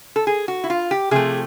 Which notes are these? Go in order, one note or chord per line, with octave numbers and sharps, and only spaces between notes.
A4
G#4
F#4
E4
F4
G4
C3 F3 A3 G#4